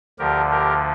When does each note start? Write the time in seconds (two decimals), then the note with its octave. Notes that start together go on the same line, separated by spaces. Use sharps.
0.19 D2 D3 F3 G4 A#4
0.51 G4 A#4